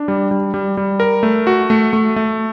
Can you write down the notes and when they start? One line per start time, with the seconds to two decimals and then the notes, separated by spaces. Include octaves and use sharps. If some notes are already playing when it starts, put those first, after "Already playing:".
Already playing: D4
0.08 G3
0.31 G3
0.54 G3
0.77 G3
1.00 A#4
1.23 A3
1.47 F#4
1.70 A3
1.93 A3
2.16 A3